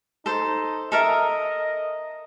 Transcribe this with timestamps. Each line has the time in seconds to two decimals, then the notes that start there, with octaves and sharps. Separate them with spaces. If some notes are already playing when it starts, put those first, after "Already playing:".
0.26 D#4 A4 C5
0.92 A4 A#4 D#5 E5